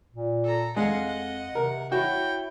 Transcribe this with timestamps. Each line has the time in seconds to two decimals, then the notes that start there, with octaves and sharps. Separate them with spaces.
0.13 A#2
0.44 A4 A#5
0.76 F2 G#3 D#5 F5 F#5
1.07 F#5
1.55 C3 A#4
1.92 E4 F#4 C#5 G5